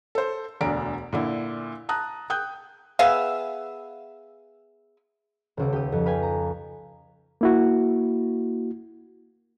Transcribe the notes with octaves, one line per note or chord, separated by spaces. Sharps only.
A4 C5
E1 D2 D4 A#5 D7
A#2 D3 E4
A5 A#5 D#6 F#6
G5 D#6 F#6 G6
B3 G#4 E5 F5
D#1 C#2 D6
G4 D#6
F2
B4 F5 G5 G#5
A#5
A#3 E4 F#4